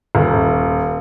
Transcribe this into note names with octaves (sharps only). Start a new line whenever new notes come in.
D#1